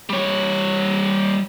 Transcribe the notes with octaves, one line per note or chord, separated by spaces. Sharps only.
G3 C#5